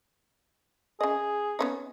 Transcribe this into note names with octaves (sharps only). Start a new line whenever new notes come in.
C#3 G#4 D#5
B3 C#4 D#4